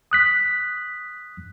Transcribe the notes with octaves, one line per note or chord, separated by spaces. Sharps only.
D#6 F#6 B6